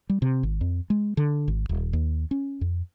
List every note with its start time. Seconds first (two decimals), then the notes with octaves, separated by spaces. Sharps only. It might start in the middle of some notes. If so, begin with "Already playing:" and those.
0.10 G3
0.22 C3
0.43 G#1
0.61 F2
0.90 G#3
1.17 D3
1.48 G#1
1.69 D#1
1.93 D#2
2.31 C#4
2.61 F2